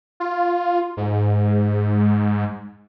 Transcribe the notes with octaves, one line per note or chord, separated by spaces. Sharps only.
F4
G#2